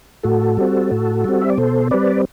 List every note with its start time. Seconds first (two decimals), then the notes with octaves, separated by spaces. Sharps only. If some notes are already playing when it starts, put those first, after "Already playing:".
0.23 A2 F#4 A4
0.57 G3 C4
0.91 A2
1.24 G3 C4
1.41 E5
1.50 D5
1.58 B2 A4 C5
1.91 G3 C4 B4 D5